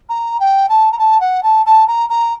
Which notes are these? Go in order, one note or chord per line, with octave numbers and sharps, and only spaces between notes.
A#5
G5
A5
A#5
A5
F#5
A5
A5
A#5
A#5